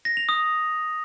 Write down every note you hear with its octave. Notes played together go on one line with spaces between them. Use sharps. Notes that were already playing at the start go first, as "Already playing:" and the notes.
A#6
F7
D#6